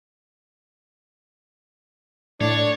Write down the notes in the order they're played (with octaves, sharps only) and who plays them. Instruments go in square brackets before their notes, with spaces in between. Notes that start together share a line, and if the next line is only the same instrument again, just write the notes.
[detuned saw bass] A2 [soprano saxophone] D4 [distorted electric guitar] C#5 [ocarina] D5